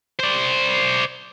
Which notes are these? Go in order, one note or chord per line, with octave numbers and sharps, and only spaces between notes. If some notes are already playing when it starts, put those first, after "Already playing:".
C5 D5